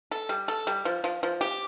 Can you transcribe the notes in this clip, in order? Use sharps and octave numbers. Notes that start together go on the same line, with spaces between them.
A4
G3
A4
G3
F3
F3
F3
G4